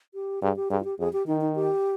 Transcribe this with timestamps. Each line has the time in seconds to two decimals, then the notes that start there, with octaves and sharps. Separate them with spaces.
0.14 G4
0.42 G2 G#4
0.56 G4
0.70 G2 G#4
0.80 F4
0.85 G4
0.99 F2 G#4
1.13 G4
1.27 D#3 D#4
1.41 D#4
1.55 G4